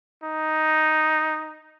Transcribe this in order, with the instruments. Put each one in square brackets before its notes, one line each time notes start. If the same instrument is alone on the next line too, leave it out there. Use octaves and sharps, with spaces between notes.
[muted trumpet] D#4